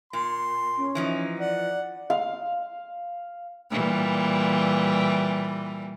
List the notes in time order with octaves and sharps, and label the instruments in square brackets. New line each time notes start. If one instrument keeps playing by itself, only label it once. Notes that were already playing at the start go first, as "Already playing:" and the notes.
[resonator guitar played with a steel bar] A#2 [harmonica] C6
[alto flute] C#4
[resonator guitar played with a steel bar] E3 F3 D#4
[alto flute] D5 [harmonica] F#5
[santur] F5
[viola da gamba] A#2 E3 G3